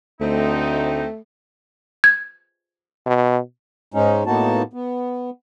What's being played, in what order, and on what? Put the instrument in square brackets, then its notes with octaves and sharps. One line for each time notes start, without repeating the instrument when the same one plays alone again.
[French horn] D2 [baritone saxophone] A3 [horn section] C4 D#4
[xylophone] G#6
[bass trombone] B2
[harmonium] G#2 G#3 C#4 D#4
A2 A#3 B3 D#4 F#4 A5
B3